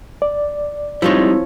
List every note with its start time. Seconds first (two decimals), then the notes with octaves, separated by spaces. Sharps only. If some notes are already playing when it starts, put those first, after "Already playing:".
0.22 D5
1.02 F3 G3 G#3 C4 D#4 E4 C#5